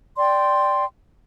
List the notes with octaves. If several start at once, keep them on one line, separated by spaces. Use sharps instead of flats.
D5 G5 C6